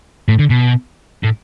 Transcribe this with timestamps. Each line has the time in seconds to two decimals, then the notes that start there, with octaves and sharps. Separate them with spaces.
0.28 A2
0.39 D3
0.50 B2
1.24 A2